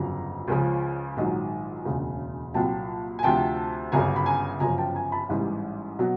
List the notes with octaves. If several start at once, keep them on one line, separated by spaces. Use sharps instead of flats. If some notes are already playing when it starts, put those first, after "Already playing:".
Already playing: G1 F2 C#3 F#3 A#5
C#2 C#3 F3
A#1 G#2 D#3 F#3
E1 D2 C#3
C2 A#2 F#3 G5 A5
G#5
D2 C3 F3 G5 A5
G1 F#2 C#3 G#5 A#5
B5
G#5 A#5
G1 F#2 C#3 F3 G#5 A#5
G5 A5
G#5 A#5
A5 B5
A1 G#2 E3 G3
B2 F#3